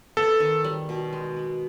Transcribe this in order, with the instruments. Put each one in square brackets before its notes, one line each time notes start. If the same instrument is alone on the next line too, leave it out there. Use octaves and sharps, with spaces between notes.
[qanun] B3 [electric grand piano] A4
[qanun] D#3
G3
B2
G#3
B3